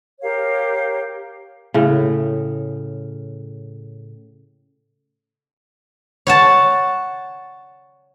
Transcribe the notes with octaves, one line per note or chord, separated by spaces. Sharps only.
G4 A#4 C#5 F5
A2 C#3
C#5 F#5 A5